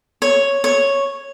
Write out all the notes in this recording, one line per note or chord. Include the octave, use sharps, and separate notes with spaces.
C#5
C#5